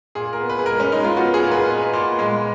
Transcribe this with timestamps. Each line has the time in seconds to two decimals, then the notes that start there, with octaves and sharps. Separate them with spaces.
0.15 A#2 G#4
0.33 A#4
0.41 B3
0.49 B4
0.59 G#4
0.66 G#3 A#4
0.80 C#4
0.92 G#3 D#4
1.04 F4
1.17 B3 F#4
1.34 G#4
1.43 A#2
1.51 B4
1.69 B3
1.93 A#2
2.19 G#3